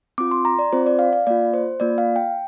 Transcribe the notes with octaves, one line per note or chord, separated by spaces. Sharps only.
C4 F4 D6
C6
A#5
D5
C4 F4 C5
D5
F5
F5
A#3 F4 D5
C5
A#3 F4 D5
F5
G5